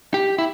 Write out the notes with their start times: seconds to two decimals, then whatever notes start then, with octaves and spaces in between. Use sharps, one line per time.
0.14 G4
0.38 E4